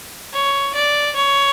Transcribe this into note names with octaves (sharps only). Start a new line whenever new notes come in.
C#5
D5
C#5